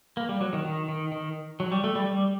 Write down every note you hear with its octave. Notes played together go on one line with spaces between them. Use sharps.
A#3
G3
F#3
D#3
D#3
D#3
D#3
F#3
G3
A3
G3
G3